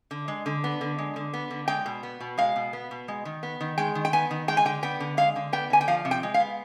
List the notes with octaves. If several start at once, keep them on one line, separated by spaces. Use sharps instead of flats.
D3
G#3
D3
B3
D3
G#3
D3
B3
D3
G#3 G5
B2
B3
B2
G#3 F5
B2
B3
B2
G#3
D#3
B3
D#3
G#3 G5
D#3
G5
B3 G#5
D#3
G#3 G5
G#5
D3 G5
B3 G5
D3
G#3 F5
D3
B3 G5
D3 G#5
G5
F3 F5
C3
G5
G#3
F5
B3